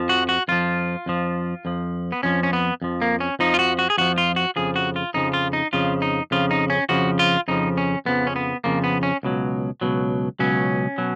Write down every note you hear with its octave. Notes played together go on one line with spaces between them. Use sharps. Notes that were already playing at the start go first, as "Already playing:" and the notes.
Already playing: F2 F3
F#4
F#4
F2 F3 F4
F2 F3
F2 F3
B3
F2 F3 C#4
C#4
B3
F2 F3
A#3
C#4
F2 F3 D#4
F4
F#4
F#4
G#4
F2 F3 F#4
F4
F#4
F2 C#3 F3 G#4
F#4
F4
F2 C#3 F3 D#4
F4
D#4
F2 C#3 F3 F4
D#4
F2 C#3 F3 F4
D#4
C#4
F2 C#3 F3 F#4
F4
F2 C#3 F3 D#4
C#4
F2 C#3 F3 B3
C#4
B3
F2 C#3 F3 A#3
B3
C#4
C#2 B2 F#3
C#2 B2 F#3
C#2 B2 F#3 C#4
B2 F#3